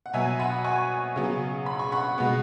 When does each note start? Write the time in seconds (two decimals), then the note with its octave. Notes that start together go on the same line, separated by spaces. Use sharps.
0.06 F#5
0.13 B2 F#3 B3 E5 G#5
0.39 F#5 B5
0.64 G#5 C#6
1.16 C#3 F#3 B3
1.66 B5
1.79 C#6
1.92 F#5 B5
2.18 B2 G#3 B3